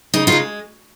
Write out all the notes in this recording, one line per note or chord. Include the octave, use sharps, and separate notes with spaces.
C#3 D#4
D#4 F4
G#3